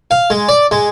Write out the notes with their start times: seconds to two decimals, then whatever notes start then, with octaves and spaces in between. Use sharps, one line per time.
0.11 F5
0.30 G#3
0.49 D5
0.71 G#3